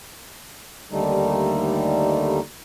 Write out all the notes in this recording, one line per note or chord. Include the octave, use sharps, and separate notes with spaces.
D#2 D3 G3 A3 D#4